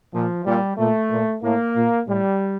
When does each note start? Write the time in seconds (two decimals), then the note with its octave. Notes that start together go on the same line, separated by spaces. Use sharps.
0.13 A#2 F3
0.45 A#2 G3
0.78 A#2 A3
1.11 A#2
1.42 A2 A#3
1.75 A#2
2.07 A2 G3